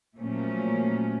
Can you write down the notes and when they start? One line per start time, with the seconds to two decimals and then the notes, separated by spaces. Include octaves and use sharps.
0.18 A#2 F3 F#3 A3 C#4